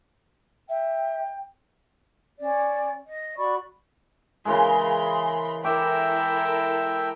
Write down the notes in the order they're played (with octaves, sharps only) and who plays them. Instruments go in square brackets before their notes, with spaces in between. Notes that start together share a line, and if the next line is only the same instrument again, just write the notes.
[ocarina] E5 [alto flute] G5
[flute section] C#4 D5
D#5
F#4 D5 B5 C#6
[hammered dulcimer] C#3 E3 G#3 [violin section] A#4 B5 C6
[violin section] E4 A4 A#4 [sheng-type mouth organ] E5 G5 [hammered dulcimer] D6